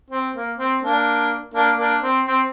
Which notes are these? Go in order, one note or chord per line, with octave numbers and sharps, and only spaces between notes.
C4
A#3
C4
A#3 D4
A#3 D4
A#3 D4
C4
C4